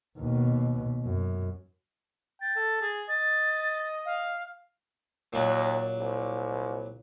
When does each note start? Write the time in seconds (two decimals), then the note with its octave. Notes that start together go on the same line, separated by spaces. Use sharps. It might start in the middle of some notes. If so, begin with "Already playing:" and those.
0.19 D#2 B2
1.05 F#2
2.41 G5 A6
2.56 A4
2.81 G#4
3.09 D#5 A6
4.05 F5
5.33 D#2 A#2 F#3
5.98 C2